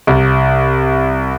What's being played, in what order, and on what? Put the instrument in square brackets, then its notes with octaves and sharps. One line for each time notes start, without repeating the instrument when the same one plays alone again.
[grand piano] C2